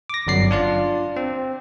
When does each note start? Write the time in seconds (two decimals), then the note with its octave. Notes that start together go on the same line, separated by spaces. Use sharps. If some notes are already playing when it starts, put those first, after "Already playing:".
0.10 D6 A#6
0.27 G1 F#2 D5 C7
0.51 D4 F4 D5
1.16 C4